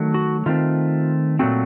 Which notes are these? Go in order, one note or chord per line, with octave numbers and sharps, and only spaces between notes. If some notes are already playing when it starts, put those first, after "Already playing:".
Already playing: D#3 F#3 A3
F#4
D#3 A3 C4 F4
A#2 F#3 A3 C4 F#4